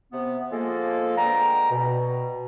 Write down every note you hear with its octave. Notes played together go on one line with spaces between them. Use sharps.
C3 B3
F3 G#3 A#3 A4
G#3 B3 D4 G5 A#5
B2